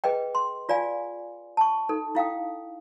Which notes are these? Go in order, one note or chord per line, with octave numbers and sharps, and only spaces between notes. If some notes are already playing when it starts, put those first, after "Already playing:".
G#4 B4 D#5 G5
C6
F4 D5 F5 G#5
A5 C#6
D#4 A4
E4 F5 G5 D#6